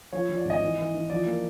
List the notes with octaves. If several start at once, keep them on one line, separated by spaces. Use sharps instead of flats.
F3 C#5
F3
D5
G#1 D#5
E3
E3
E3
F3 D5
A#3